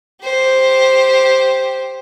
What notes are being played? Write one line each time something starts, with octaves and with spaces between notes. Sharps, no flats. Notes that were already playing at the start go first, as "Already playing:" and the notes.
G4 C5